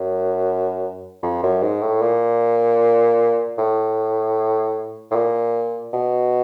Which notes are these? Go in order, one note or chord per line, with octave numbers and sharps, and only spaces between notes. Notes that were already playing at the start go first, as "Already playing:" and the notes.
Already playing: F#2
F2
F#2
G#2
A2
A#2
A2
A2
A#2
B2